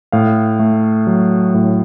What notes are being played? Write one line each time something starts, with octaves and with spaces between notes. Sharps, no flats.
A2 F5
A3
F#3
A2